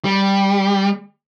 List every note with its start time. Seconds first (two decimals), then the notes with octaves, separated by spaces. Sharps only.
0.05 G3